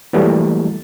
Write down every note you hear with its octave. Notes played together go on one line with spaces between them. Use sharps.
E3 F#3 G3 A3 A#3